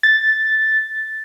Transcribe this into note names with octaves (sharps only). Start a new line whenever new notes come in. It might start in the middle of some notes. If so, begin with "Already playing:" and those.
A6